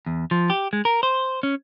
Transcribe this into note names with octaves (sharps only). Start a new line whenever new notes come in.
E2
F3
G4
G#3
A#4
C5
C#4